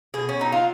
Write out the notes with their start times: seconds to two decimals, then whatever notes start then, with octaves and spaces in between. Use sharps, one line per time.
0.14 B2 G#4
0.29 C#4
0.39 F#3 D#4
0.52 F4